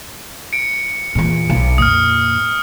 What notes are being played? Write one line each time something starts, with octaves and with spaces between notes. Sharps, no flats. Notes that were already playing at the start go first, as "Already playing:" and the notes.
C#7 D7
E2 A#2
B1 F#3
F2 A#2 D#6 F6